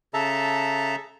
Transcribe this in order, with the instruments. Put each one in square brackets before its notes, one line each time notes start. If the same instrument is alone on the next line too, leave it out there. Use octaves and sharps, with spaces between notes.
[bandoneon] C#3 A4 E5 A5 A#5